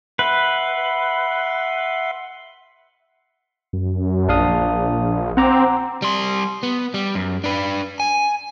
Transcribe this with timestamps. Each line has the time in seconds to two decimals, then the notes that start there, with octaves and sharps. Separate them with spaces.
0.19 B4 E5 F#5 C6
3.73 F#2
4.29 A#1 D4 F5 D#6
5.37 C4 F#5 A#5 D6
6.02 G3 C6
6.63 B3
6.94 G3
7.15 F#2
7.44 D4 B4
8.00 G#5